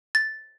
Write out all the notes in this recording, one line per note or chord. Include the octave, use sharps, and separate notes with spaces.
A6